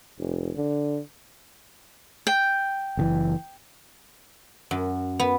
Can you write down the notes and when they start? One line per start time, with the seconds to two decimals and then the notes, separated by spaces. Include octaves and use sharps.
0.19 F1
0.56 D3
2.27 G5
2.97 F#1 C3 E3
4.71 F#2
5.19 B3